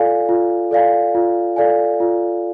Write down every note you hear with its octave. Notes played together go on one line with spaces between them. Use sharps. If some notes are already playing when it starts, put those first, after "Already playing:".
Already playing: F4 A4 D5 F5 G#5
F4
A4 D5 F5 G#5
F4
A4 D5 F5 G#5
F4